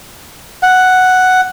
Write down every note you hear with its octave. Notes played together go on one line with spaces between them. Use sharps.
F#5